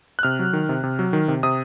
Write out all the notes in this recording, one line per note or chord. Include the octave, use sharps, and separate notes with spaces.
F#6
C3 F6
F#3
D#3
C3
C3
F#3
D#3
C3
C3 D#6